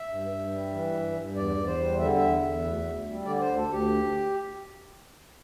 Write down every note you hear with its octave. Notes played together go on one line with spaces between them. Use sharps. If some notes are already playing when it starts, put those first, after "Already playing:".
Already playing: E5
G2
G2
G3
E3
G2
G2
E2 D5
E2
C5
G3
D3 E5
E2 E5
E2
D2
D2
G3
D3 D5
D5
C5
D2
A4
D2 G4